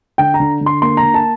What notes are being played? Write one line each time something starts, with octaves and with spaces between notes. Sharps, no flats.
D3 G5
A#5
D3
D3
C6
A#3 C6
A#5
D3
A5